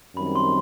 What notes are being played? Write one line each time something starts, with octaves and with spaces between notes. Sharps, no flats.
F#2 D#3 G3 C4 B5
C6